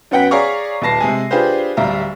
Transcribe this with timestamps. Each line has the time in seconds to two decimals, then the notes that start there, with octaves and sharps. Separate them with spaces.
0.11 F#2 B3 F#5 G5 B6
0.31 G#4 C#5 D5 F5 A#5 C#6
0.82 D#1 B4 A5 A#6 C7
1.00 C3 G#3 G#4 G#5
1.31 D4 F4 G4 G#4 B4 C5
1.77 D1 G3 E5 F5 A#5